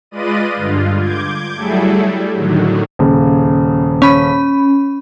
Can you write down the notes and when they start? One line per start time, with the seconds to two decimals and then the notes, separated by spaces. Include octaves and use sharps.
0.11 G#3 F4 B4 D5 D#5 D#7
0.56 G2 D3 F4
0.98 D6 G6 G#6
1.57 F#3 G3 A3 E4 G#4 A4
2.01 G3
2.34 A2 D3 D#3 F#3
2.99 D#1 C#3
4.02 C#4 B5